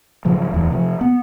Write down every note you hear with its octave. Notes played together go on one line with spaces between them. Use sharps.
G#2 C#3 F3 F#3
D1 E2
C3 D#3 F3
B3